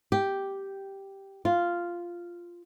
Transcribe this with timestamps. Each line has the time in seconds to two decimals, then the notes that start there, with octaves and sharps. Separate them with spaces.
0.12 G4
1.45 F4